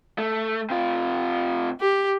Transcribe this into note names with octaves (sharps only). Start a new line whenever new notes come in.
A3
C3 F4
G4